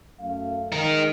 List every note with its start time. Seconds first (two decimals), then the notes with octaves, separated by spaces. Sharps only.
0.19 F#2 A3 F5
0.72 D#3 G#3 D#4 A#4